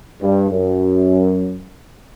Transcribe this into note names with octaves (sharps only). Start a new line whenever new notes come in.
G2
F#2